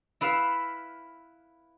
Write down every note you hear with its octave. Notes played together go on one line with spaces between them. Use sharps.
E4 B4 E5 F5